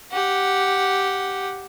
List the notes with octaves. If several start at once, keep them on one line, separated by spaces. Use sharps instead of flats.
G4 F#5